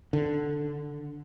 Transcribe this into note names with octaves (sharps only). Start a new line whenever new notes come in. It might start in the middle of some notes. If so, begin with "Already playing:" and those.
D3